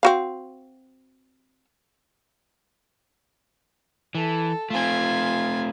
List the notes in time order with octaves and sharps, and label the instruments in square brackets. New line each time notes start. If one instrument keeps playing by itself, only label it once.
[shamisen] C4 F#4 F5
[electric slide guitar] E3 [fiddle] A4
[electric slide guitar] A3 C4 [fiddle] F4 G#5